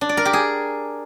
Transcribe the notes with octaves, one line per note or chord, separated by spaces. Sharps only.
D4
D5
A#4
G4
G#4